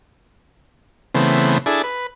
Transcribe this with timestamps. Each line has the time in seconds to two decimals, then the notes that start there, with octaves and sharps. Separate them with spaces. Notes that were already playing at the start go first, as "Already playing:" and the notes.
1.15 C#3 E3 A3 B3 C4
1.66 D4 E4 G#4 A4
1.84 B4